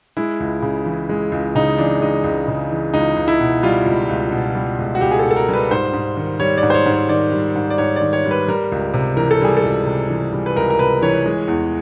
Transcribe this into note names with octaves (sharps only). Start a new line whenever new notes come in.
G#3 E4
C#2
C#3
E3
G#3
C#2
C#3 D#4
E3 D4
G#3 D#4
C#2
C#3
E3
C#2 D#4
C#2
E4
B2
G3 F4
C#2
C#2
B2
G3
C#2
F#4
C#2 G4
G#4
A4
B2
A4
A#4
G3
B4
G#2 C5
G#2
D#3
G3 C#5
D5
G#2
C5
C#5
G#2
C#5
D#3 D5
G3
G#2
D5
G#2 C#5
D5
D#3
C#5
G3
B4
G3 A#4
C#2
C3
E3 A#4
A4
G3 G#4
A4
C#2
C3
E3
G3
B4
C#2 A#4
A#4
C3 B4
E3 C#5
G#3
E2